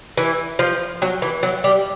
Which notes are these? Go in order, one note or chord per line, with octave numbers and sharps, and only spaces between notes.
E3
F3
F#3
E3
F#3
G3